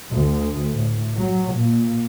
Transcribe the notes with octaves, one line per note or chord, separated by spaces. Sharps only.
D2
A2
F#3
A#2